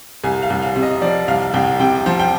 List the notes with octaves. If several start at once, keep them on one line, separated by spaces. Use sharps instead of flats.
C2 G#5
F5
C2
F5
C3
D#5
F3 D5
C2 F5
C2 G5
C3 G5
F3
G5